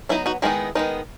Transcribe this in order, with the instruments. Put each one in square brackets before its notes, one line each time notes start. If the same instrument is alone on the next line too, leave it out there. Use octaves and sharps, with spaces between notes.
[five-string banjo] F#3 B3 D#4 E4
D#4 F#4
D#3 G#3 B3 D#4 E4 G#4
D#3 G#3 B3 D#4